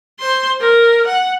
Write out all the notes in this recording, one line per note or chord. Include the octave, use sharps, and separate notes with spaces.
C5 C6
A#4
F#5